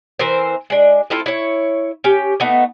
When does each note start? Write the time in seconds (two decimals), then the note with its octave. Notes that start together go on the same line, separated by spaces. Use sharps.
0.19 E3 C4 A#4 C5
0.70 G#3 D4
1.10 A3 C4 E4 F4
1.26 E4 C#5
2.04 C#4 G4
2.40 A3 B3 D#4